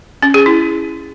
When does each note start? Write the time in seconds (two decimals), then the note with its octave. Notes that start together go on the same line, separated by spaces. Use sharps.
0.22 C#4
0.34 G#4
0.46 E4